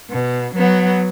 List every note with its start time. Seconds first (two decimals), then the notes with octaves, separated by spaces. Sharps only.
0.11 B2
0.56 F#3 B3